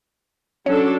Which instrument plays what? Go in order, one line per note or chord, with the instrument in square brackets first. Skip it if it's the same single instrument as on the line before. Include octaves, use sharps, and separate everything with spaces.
[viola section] F#3 D4 A4 [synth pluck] C#4